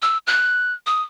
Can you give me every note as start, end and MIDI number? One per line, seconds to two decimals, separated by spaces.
0.02 0.18 88
0.27 0.73 90
0.86 1.02 87